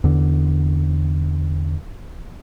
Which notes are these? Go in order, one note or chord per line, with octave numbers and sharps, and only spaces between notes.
E2 D3